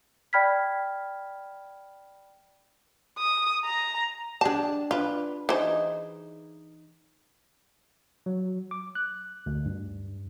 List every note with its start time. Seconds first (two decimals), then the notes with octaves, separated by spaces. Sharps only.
0.33 D5 G5 B5 F6 G#6 B6
3.19 D#6
3.65 A#5
4.41 D4 G4 G#4 A5
4.91 D4 F4 B4
5.49 E3 D#4 G#4 C5
8.26 F#3
8.71 D6
8.95 F#6
9.46 D2
9.66 G2